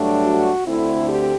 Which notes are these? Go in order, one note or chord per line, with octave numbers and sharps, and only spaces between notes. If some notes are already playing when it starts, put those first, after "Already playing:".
Already playing: G2 F#3 A3 D4
F#4
D2 D3 A3 C4 E4
G4